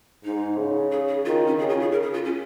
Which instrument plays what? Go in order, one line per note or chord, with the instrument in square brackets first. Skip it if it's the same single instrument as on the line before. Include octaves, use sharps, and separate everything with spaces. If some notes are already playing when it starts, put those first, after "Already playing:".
[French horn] G#2 [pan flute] D#4
[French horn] C#3
[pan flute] G#4
G#4
[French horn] D#3 [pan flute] F4
[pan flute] C#4
[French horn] C#3 [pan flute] G#4
[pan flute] F4
G#4
A#4
G#4
F4
C#4